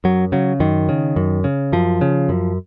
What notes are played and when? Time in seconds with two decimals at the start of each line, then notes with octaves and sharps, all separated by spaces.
0.04 F#2 F#3
0.32 C#3 F#3
0.60 F#2 D#3
0.89 C#3
1.16 F#2
1.44 C#3
1.72 F#2 F3
2.01 C#3
2.29 F#2